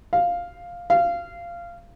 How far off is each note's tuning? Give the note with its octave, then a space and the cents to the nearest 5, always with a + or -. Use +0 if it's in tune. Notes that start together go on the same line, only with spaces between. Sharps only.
F5 +5
F5 -15